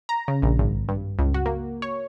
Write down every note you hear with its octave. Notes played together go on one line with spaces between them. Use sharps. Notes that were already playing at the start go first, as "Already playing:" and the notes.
A#5
C#3
A#1
G#1
G2
C#2
F#4
A#3
C#5